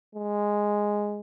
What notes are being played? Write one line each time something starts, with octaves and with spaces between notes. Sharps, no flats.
G#3